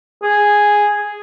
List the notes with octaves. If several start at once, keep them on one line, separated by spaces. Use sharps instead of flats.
G#4